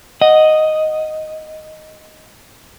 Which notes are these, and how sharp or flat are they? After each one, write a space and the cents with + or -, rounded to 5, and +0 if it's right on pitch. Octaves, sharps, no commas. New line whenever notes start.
D#5 +0 F#5 +0